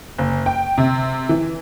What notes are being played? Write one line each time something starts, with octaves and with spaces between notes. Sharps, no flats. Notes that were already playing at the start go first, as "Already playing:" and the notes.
F#1
G5
C3
E3